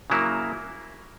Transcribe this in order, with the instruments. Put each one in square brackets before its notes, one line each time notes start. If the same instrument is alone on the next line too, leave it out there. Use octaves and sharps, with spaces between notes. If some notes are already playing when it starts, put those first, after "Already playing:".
[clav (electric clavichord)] C#3 F#3 A#3 E4